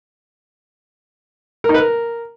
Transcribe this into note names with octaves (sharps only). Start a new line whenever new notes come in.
A#4
D#4
B4
A#4